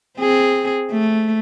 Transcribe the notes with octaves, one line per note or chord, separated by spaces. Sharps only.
C4 G#4
A3